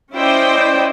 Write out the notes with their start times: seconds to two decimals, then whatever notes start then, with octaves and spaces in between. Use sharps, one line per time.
0.13 C#4 E4 C5 D5 D#5 G5